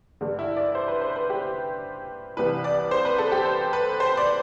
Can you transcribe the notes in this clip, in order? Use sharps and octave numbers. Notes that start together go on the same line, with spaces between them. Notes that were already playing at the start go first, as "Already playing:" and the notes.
G2 D3
E4
D5
C5
B4
C5
B4
G4
C2 C3 E3 B4
D5
C5
B4
A4
G4
C5
B4
C5
D5